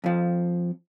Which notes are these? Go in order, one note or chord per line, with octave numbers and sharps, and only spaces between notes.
F2 F3